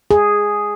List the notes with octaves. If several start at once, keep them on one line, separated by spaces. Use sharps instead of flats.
G#4